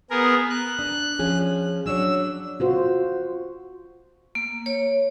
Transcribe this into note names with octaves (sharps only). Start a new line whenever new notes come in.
B3 G#4 A#4
F#6
D4
F3 C#4 G#4
F#3 D4 C#5 E6
F4 F#4 C5
A#3
C#5